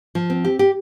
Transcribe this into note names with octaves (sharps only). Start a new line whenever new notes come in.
F3
C4
G4
G4